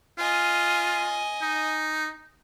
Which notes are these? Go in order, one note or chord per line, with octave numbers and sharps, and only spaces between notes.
F4 D#5 G#5
D#4